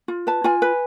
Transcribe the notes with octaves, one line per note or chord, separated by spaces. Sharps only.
F4
B4 A5
F4 G#5
B4